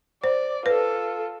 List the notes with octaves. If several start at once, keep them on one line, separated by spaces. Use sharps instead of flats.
C5 D5
F4 A4 B4